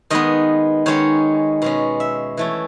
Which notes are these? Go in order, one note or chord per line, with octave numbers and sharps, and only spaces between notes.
D#3 G#3 B3 D#5
D#3 G#3 C#4 C#5
B2 G#3 C#4
E5
E3 A3 C#4